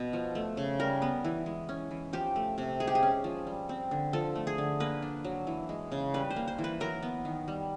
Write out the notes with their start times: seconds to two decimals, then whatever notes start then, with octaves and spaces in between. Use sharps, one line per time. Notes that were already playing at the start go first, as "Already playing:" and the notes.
Already playing: B2 B3
0.13 F3
0.35 A3
0.57 C#3
0.79 G3 A#4
1.02 B3
1.24 E3
1.46 G#3
1.69 C#4
1.91 E3
2.13 F3 G4
2.36 A3
2.58 C3
2.80 G#3 G#4
2.87 G4
2.95 G#4
3.03 C#4
3.24 F3
3.47 G3
3.69 C4
3.91 D3
4.13 F3 A4
4.35 A3
4.47 G#4
4.58 D3
4.80 A#3 B4
5.02 D4
5.24 F#3
5.47 E3
5.69 G#3
5.92 C#3
6.14 G3 B4
6.30 C5
6.36 A#3
6.48 C5
6.59 E3
6.64 B4
6.80 F#3 A#4
7.02 B3
7.25 D#3
7.48 G3